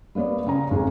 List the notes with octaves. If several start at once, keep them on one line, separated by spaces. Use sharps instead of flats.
G3 A#3 B3 C#5 D5
C#3 C#4 A#5
G#1 F2 G#4